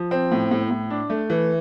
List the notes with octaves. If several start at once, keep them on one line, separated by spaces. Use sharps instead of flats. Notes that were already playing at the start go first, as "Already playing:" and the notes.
Already playing: F3
C4
A2
A2
A2
D4
A3
E3